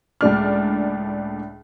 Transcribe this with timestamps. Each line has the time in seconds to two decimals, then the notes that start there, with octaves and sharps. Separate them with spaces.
0.21 C#2 A2 D4 F6